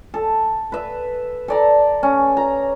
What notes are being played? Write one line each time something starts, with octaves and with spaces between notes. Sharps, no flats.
A4
B4 E5
A4 D5 A#5
C#4
A#5